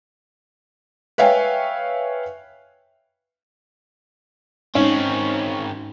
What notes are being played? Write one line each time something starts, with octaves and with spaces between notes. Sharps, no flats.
B4 C#5 E5 F5 G5 G#5
G#2 D#3 C4 C#4